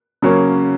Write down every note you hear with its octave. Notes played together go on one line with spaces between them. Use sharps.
C#3 F#3 A#3 C#4